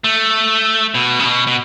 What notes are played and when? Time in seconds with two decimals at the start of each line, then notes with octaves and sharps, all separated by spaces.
0.04 A3
0.95 B2
1.19 C#3
1.25 B2
1.47 B2